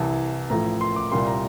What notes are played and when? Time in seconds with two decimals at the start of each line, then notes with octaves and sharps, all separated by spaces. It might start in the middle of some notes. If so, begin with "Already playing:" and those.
Already playing: C2 C3 E3 A5
0.50 A1 A2 F3 A#5
0.81 C6
0.96 D6
1.12 C2 A#2 G3 A#3 C6
1.27 A#5